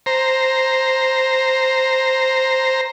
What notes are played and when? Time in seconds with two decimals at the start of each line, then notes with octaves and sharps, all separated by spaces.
0.06 C5 A#5